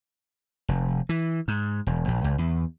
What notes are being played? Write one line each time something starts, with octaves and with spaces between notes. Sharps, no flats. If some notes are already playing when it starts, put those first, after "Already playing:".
F1
E3
G#2
E1
A#1
C#2
E2